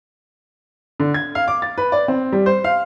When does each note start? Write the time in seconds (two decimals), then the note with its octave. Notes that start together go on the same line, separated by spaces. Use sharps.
1.00 D3
1.14 G#6
1.35 F5
1.48 D6
1.62 A6
1.78 B4
1.92 D5
2.08 C4
2.32 G3
2.46 C5
2.64 F5